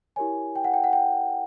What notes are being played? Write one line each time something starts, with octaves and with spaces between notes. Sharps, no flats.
E4 G4 A#4 C#5 G#5
G5
F#5
G5
F#5
G5